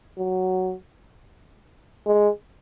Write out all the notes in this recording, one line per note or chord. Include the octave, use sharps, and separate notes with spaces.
F#3
G#3